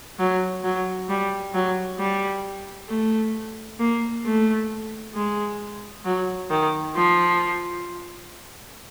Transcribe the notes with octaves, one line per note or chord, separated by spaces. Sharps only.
F#3
F#3
G3
F#3
G3
A3
A#3
A3
G#3
F#3
D#3
F3